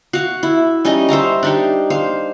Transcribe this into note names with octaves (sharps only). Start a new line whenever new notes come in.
F#4 F5
E4
G3 C#4 D#4 D#5
C5 E5 F5 A#5
D4 D#4 G4
C5 F5